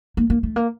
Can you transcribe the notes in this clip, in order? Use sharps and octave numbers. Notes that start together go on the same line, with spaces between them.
A#3
A#3
A3
A#3